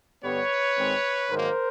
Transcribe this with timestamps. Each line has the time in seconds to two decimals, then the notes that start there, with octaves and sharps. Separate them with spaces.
0.24 G2 D3 G3 B3 B4 C#5
0.77 G#2 D#3 G#3 C4
1.30 G#2 D#3 F#3 A#3 A#4 C5